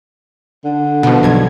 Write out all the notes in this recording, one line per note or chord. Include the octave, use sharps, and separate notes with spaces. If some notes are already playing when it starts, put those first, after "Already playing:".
D3
B2 F3
B1 G2 G#6